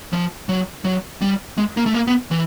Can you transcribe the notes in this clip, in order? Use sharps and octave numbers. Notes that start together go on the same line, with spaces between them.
F3
F#3
F#3
G3
G#3
A#3
A3
A#3
B3
E3